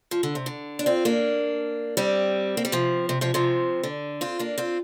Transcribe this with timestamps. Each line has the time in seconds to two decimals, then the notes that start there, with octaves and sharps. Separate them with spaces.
0.11 F3
0.23 D3
0.35 C3
0.46 D3
0.79 D4
0.86 C4 F4
1.05 A#3 D4
1.97 G3 C4
2.57 A#3
2.65 G3
2.72 C3 F3
3.09 C3
3.21 C3 F3
3.34 C3 F3
3.83 D3
4.21 C4 F4
4.39 A#3 D4
4.58 C4 F4